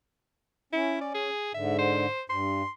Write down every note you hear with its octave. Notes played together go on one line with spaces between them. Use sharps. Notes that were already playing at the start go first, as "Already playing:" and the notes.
C#4 E4
D5
G#4
G#2 D3 E5
C5
G2 C6